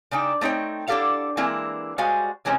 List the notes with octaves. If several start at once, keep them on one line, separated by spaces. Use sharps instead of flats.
C#3 D4 D#4 G5
A3 C4 D#4 C#5 G5
D4 E4 G4 A4 F5 F#5
E3 G#3 A#3 C4 D4 E4
G3 G#3 F#4 C5 F5 G#5
C3 E3 G#3 C4 C#4